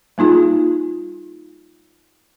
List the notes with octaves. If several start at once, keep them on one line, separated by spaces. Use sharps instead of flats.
G3 A#3 D#4 F4 G#4